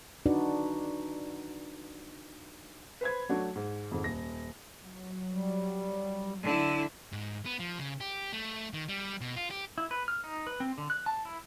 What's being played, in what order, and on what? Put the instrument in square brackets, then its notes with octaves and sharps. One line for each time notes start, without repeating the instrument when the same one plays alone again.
[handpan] D4 D#4 F#4 B4 D5
[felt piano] B4 C5 B5 G#6
F#3 A3 D4 F#4
G#2
F2 G#2 D#3
D#1 A#6
[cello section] F#3
[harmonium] G3
[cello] D3 E4
[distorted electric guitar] G#2
B3
F3
C#3
G4
A3
D#3
G3
B2
F4
G4
[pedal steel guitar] E4
B4
F6
D#4
B4
C4
D3
F#6
A5
E4